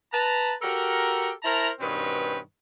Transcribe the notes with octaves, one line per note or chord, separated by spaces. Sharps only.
B4 A5 A#5
F#4 G4 A4 A#4
E4 A#4 C5 A5 A#5
G2 B2 D#3 C4 C#4 B4